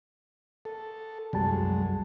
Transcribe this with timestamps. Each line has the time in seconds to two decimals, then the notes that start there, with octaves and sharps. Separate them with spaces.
0.65 A4
1.33 C2 F#2 G3 G#3 A5